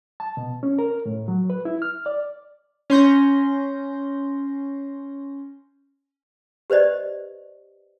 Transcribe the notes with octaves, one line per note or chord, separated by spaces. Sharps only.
A5
B2
C#4
A#4
A2
F#3
B4
E4
F6
D5
C#4 C6 G6 A#6
G4 B4 C5 D5 D#5